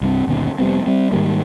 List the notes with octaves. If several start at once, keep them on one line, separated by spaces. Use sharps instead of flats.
C2 G2 C4
G1 D#2 B2 C#4
F1 G3 B3 C4
G3 C4
G#2 D#3 G3 A#3